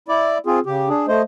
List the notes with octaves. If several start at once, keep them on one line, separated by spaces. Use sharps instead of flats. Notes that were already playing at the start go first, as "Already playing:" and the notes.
E4 D5
C4 F4 G#4
C#3 G4
D4 G#4
A3 C5 D#5